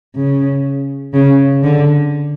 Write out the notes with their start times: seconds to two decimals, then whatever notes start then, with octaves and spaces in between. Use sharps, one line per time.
0.16 C#3
1.14 C#3
1.63 D3